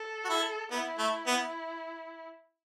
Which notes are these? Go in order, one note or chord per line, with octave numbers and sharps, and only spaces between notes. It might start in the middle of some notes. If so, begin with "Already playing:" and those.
Already playing: A4
F#4
E4
B3 E4
A3
B3